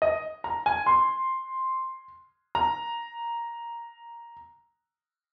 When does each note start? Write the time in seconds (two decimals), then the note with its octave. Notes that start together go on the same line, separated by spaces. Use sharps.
0.02 D#5
0.44 A#5
0.66 G#5
0.86 C6
2.55 A#5